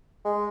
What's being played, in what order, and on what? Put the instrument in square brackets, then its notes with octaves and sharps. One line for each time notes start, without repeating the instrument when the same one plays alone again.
[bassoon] G#3